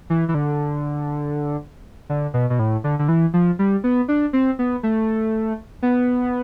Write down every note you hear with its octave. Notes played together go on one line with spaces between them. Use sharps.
E3
E3
D3
D3
B2
B2
A2
D3
D3
E3
F3
G3
B3
D4
C4
B3
A3
B3